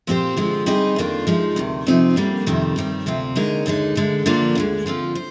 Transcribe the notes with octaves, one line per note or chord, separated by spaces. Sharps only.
A#2 F3 C4 G4 C5
D3 F3 G#3 C4 F4
G3 C4 D#4 G#4 D#5
F2 D#3 A#3 D4 F4
F3 G#3 D#4
D2 C3 D#3
D2 C3 F3 C4 D#4
D#2 D3 G3 A#3
F2 C3 D#3 G3 C4
G2 D#3 G3 C4
D2 C3 F3 C4 F4
D#2 D3 G#3 D#4 A#4
D#2 D3 G#3 D#4
D2 D3 G#3
D3 F3 A#3 D4 F4
D2 D3 G#3
D3 F3 C4 F4
C5